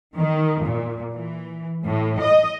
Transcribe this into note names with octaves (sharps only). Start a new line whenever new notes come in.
D#3
A#2
E3
A2
D#5